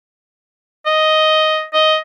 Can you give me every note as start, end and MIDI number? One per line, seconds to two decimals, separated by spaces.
0.86 1.64 75
1.74 1.97 75